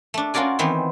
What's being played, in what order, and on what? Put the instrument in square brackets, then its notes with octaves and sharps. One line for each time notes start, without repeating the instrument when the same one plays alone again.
[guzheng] A3 D4
C#4 F4 F#4 A#4 D5 G#5
D#3 E3 B3 C4